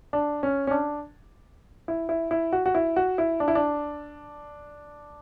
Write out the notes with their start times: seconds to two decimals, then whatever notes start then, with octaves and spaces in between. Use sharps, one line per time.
0.13 D4
0.43 C#4
0.67 C#4
0.71 D4
1.88 E4
2.09 E4
2.31 E4
2.53 F#4
2.66 F#4
2.75 E4
2.96 F#4
3.18 E4
3.40 D4
3.48 E4
3.55 D4